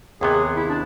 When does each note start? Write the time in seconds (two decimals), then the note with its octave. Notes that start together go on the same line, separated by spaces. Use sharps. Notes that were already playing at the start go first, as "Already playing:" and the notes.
0.21 D#2 C3 B3 G#4
0.56 E4
0.70 D4